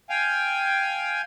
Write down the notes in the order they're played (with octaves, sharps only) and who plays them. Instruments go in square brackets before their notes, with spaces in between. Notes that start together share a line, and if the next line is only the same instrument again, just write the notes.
[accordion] F5 G5 G#5